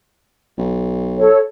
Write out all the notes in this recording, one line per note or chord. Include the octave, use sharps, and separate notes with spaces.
B1
A4 C#5